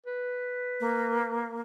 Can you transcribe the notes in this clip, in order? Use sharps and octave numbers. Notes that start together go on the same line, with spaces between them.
B4
A#3